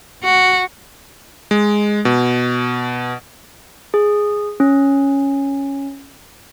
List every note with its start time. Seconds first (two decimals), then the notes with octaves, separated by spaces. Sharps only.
0.24 F#4
1.51 G#3
2.05 B2
3.94 G#4
4.60 C#4